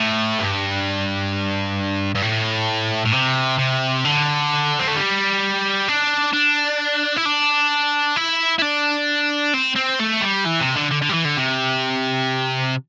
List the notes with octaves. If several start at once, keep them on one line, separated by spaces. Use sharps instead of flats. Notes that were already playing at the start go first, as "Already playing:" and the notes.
Already playing: A2
G2
G2
A2
A2
C3
C3
D3
C4
A3
G3
D4
D4
E4
D4
E4
E4
D4
C4
C4
A3
G3
E3
C3
D3
D3
D3
G3
E3
D3
C3